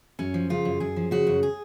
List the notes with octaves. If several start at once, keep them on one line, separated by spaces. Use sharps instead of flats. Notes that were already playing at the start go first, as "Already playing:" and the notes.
F#2 C#4
F3
C#3 F4
F#2
F#2 G#4
F3
C#3 F#4
F#2
G#4